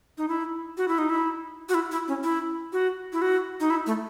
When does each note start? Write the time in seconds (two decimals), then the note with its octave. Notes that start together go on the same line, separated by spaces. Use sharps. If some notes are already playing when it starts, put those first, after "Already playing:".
0.18 D#4
0.28 E4
0.77 F#4
0.88 E4
0.98 D#4
1.09 E4
1.69 F#4
1.74 E4
1.91 E4
2.08 C#4
2.23 E4
2.73 F#4
3.13 E4
3.22 F#4
3.60 D#4
3.70 E4
3.86 A3